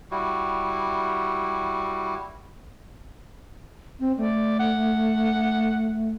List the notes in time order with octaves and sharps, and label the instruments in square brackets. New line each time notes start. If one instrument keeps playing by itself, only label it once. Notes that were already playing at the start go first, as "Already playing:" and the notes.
[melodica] G3 E4 F#4
[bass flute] C4
[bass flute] A3 [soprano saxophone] D5
[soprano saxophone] F#5